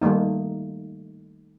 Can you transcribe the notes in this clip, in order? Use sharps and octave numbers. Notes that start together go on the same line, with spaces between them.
D#3 G3 A3 A#3 D#4